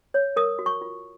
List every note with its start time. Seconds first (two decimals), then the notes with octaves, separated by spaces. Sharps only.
0.14 C#5
0.36 A#4 D#6
0.59 F#4
0.66 C#6
0.81 F4